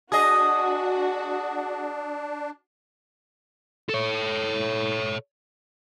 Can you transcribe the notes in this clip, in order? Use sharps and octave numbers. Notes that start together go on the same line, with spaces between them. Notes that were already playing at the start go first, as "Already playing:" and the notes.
D4 F#4 G#4 D#5 D#6
A4 C#5